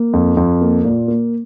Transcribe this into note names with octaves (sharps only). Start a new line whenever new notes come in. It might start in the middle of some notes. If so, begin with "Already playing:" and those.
Already playing: A#3
F2
F2
A#3
A#2
A#3